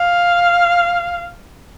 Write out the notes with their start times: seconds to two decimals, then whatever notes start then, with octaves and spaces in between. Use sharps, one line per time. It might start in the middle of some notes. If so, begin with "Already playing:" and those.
Already playing: F5